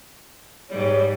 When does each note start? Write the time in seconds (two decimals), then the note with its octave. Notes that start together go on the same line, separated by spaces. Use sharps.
0.69 G#2 G3 C#5